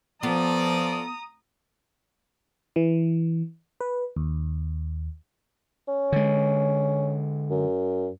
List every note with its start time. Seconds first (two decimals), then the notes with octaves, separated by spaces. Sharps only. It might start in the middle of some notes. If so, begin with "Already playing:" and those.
0.23 F3 B3 F4 A4 D5 A#5 D#6
2.76 E3
3.81 B4
4.16 D#2
5.88 C#4
6.12 D3 G#3
7.50 F#2